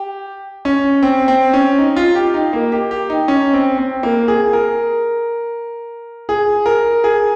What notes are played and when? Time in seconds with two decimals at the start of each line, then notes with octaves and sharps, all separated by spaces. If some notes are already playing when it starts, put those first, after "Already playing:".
Already playing: G4
0.65 C#4
1.03 C4
1.28 C4
1.53 C#4
1.78 D#4
1.96 F4
2.15 G4
2.34 D#4
2.53 A#3
2.72 G4
2.91 G4
3.10 D#4
3.28 C#4
3.53 C4
3.78 C4
4.03 A#3
4.28 G#4
4.53 A#4
6.29 G#4
6.66 A#4
7.04 G#4